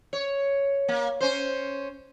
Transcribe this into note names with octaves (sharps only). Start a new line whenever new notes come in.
C#5
A#3
C#4 C5